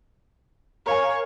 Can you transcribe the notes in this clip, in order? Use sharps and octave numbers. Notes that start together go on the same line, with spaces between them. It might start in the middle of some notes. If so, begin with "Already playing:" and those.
A#4 C#5 F5 G#5